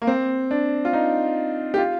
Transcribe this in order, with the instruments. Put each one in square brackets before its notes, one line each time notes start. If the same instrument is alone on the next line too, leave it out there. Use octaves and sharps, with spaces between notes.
[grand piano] A#3
C4
D4
F4
D#4
G4
F4